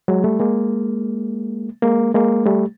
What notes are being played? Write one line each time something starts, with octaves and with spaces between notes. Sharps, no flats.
F#3 G#3
G3 A3
G#3 A#3
G#3 A#3
G#3 A#3
G3 A3